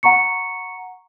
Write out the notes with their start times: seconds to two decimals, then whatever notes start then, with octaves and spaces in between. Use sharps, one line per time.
0.03 F#5 A#5 C#6 C#7